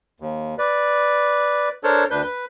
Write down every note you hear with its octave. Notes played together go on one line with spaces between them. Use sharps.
D#2
B4 D5
D4 A4 A#4 C5 C#5
D2 D4 B4 G6
B4